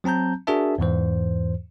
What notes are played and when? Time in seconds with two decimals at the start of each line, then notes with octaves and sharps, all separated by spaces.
0.04 F#3 C4 A5 A#5 G6
0.47 D4 F#4 G#4 A#4 E5 A5
0.78 E2 G#2 E3 C5